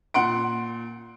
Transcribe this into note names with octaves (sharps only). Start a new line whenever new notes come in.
A#2 F#5 C6 D7